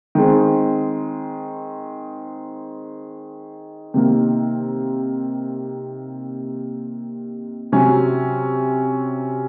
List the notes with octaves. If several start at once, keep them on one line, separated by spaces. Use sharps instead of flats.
D#3 G#3 C4
C3 D#3 A#3
C3 F#3 C#4